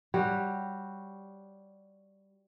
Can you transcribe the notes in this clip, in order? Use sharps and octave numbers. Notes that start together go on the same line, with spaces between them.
G3 F#4 G4 C#5